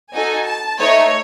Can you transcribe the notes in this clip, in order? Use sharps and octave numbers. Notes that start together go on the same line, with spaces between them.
D#4 F#4 A4 G#5
A5
A3 D#4 A4 C#5